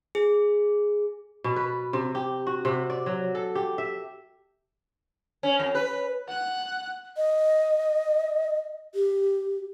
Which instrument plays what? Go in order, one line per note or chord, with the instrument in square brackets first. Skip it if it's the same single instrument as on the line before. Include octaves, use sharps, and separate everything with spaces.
[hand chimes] G#4
[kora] B2
B4
C3
G4
F#4
C3
D5
F#3
A4
G4
E5
[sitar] C#4
F2
B4
[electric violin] F#5 F#6
[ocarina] D#5
G4